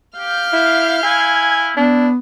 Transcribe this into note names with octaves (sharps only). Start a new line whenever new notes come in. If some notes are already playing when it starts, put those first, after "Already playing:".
G4 F5 F6 G6
E4
E4 G#5
B3 D4 E4